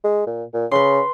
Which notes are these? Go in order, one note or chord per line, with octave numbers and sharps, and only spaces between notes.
G#3
A#2
A#2
C#3 B4 C6